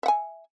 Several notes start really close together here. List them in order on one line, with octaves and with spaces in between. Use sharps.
E5 F#5 G#5